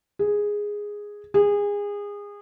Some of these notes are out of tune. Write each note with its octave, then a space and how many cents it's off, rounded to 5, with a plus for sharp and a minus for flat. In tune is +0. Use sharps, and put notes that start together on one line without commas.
G#4 -5
G#4 -25